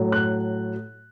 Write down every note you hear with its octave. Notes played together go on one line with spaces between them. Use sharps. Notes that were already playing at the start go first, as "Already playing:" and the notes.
Already playing: A2 F#3
F#6